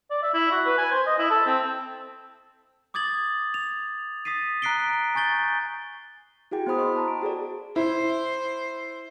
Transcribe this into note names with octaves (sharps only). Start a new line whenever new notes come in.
D5
E5
E4
F#4
B4
G#5
C5
D#5
E4
A4
C4
D6 D#6 G#6 A6 F#7
F7
D#6 A6 B6 C7 D#7
A#5 F#6 B6 C7 D7 G7
G#5 C#6 G6 A6 G7
E4 F#4 G#4 G5
B3 E4 C5 B5 D#6
D#5 C6 C#6
A5 A#5
D7
F#4 G#4 A4 D5
E4 C5